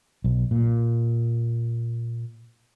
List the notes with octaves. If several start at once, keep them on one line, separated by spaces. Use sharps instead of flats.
B1
A#2